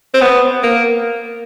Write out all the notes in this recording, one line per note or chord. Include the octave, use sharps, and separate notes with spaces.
C4
B3
A#3